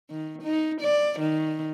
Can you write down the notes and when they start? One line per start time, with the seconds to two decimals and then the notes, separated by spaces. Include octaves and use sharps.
0.11 D#3
0.43 D#4
0.81 D5
1.20 D#3